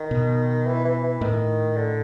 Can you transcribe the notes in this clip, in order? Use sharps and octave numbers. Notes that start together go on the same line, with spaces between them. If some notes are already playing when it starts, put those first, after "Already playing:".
Already playing: D#3
B2
E3
E3
E3
A2 D#3
D3